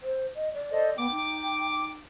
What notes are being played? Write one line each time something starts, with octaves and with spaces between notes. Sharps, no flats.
C5
D#5
D5
A4 C5 D#5
B3 G5 D6
D#4